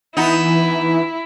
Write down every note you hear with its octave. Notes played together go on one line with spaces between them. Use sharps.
E3 B3 D#4 E4